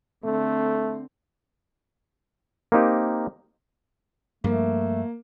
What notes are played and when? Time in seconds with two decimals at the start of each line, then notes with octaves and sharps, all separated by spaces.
0.24 D3 A3 C4
2.72 A#3 C4 D#4 G4 A#4
4.44 G2 F3 A3 A#3